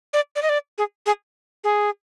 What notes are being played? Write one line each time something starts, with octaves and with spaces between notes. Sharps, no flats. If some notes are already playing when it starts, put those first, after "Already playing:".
D5
D5
D#5
D5
G#4
G#4
G#4